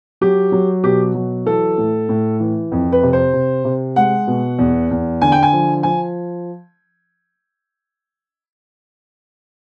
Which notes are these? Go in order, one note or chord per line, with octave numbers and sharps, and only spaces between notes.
F#3 G4
F#3
B2 G4
F#3
E3 A4
A2
A2
E3
F2
B4
C3
C5
C3
C3
G#3 F#5
B2
E2
E2
D3 G#5
G5
G#5
F3
F3 G#5